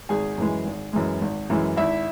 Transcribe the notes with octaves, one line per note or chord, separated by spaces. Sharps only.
G#1 G#4 G#5
F#2 E3 G#3
G#1
F#2 E3 G#3
G#1
F#2 E3 G#3
G#1 E4 E5